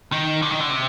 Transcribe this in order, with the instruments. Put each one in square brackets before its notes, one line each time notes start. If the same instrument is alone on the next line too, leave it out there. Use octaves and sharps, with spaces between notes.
[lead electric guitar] D#3
D3
D#3
D3
C3